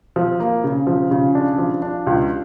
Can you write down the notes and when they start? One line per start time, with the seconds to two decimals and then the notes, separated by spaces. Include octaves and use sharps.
0.16 F3
0.40 A#3
0.64 C#3
0.87 F3
1.11 C#3
1.35 D4
1.59 F3
1.82 D4
2.07 C#2